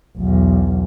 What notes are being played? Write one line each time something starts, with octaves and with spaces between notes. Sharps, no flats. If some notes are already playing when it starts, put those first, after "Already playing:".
B1 E2